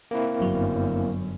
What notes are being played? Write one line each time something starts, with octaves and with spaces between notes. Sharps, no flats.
A#3 C4 E4
G1 F#2 F#3